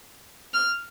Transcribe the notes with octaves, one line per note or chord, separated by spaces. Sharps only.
F6